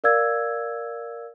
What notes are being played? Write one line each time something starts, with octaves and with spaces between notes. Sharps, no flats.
A#4 D5 F5 E6 G#6